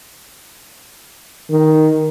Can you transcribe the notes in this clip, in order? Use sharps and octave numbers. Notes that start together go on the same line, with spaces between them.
D#3